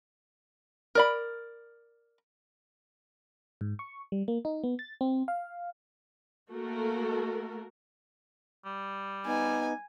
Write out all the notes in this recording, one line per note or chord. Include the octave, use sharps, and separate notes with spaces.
A#4 D5 B5
G#2
C#6
G3
A#3
D#4
B3
A6
C4
F5
A3 A#3 F#4 A4 A#4
G3
B3 D#4 G#5